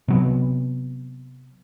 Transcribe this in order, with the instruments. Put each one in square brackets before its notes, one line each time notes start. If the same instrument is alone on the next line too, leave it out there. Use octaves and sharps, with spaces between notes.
[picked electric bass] C3 F#3 B3